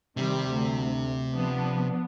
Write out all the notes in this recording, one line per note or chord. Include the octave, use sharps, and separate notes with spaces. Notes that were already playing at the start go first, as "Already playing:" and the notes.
C3 D#3 G3
D2
F3 B3 D4